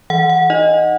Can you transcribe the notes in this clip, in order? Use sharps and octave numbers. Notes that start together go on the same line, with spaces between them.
E3 F#5
F#5
D#4 D#5